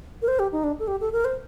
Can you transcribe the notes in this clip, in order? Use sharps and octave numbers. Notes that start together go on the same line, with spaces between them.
A#4
C5
G4
D#4
D4
A4
G4
A4
A#4
C5